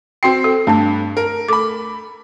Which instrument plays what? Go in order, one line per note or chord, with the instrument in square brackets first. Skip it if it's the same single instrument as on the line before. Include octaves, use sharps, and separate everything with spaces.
[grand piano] C4 C7 [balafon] F#4 G5
[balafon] A4
[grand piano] G2 [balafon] A3 D4 A5
[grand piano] A#4
[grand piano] A3 B5 [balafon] D6